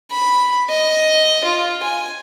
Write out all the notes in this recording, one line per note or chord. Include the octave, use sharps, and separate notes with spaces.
B5
D#5
F4
G#5